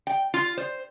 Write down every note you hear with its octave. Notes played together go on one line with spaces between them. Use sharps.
G5
F4
C5